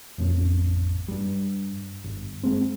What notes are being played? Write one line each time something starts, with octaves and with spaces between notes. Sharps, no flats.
A1 F2 C#4
G2 G3
G1
G#3 C4